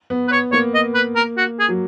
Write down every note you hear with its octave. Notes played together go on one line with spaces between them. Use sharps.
B3
B4
C#5
A#3 C#5
D#5
B4
A#4
F#4
G#4
F#3